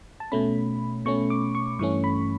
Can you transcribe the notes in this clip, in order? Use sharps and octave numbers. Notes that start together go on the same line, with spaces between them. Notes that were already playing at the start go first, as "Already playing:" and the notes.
A5
B2 A3 C#4 B5
B2 A3 C#4 C#6
D6
C#6
G2 E3 A3 C#4 C#6
B5